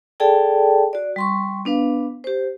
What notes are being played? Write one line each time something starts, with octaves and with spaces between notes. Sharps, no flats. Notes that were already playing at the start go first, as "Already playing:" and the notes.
G#4 A4 D5 G5 A5
F#4 D5
G3 C6 C#6
B3 D4 B4 F5
G4 C5